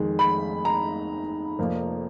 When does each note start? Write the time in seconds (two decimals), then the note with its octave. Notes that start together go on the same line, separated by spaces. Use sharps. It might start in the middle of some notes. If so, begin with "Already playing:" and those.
Already playing: F2 D#3 G#3
0.19 B5
0.65 A#5
1.59 F1 F2 F3 A#3